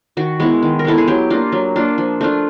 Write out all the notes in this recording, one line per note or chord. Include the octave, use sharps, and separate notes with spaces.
D#3 F#4
G#3 B3 E4
D#3
A#4
G#3 B3 E4 A4
G#4
F#3 G4
A#3 D4 F4
F#3
A#3 D4 F4
F3
A3 D4 F4